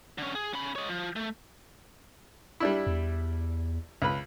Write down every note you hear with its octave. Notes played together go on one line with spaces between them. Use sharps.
D3 C#4
G#4
C#4 B5
C#5 D#5
F3
A3
G3 D4 E4
E2
C#2 B4